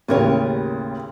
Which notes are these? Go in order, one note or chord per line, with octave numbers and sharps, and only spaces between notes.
A1 D#2 C#3 B3 A#4 C#5